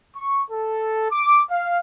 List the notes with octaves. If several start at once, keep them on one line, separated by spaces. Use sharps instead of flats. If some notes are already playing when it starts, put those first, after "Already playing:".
C#6
A4
D6
F5